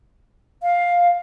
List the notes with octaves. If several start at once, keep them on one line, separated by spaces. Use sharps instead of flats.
F5